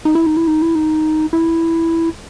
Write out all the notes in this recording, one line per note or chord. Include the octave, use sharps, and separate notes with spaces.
D#4
E4
D#4
E4
D#4
E4
D#4
E4